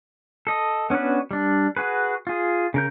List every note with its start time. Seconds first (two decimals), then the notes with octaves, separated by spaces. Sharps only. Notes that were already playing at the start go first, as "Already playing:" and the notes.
0.47 A4 D#5
0.90 B3 C#4 D4 F#4 B4
1.31 G3 D4
1.77 F#4 G#4 B4
2.27 F4 G#4
2.74 C#3 A#4 G6